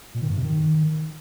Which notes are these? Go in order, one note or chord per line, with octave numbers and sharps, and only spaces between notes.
A#2
D#3
G2
C3
D#3